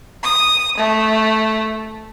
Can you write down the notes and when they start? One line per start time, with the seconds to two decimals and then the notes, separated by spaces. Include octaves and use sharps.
0.23 D#6
0.78 A3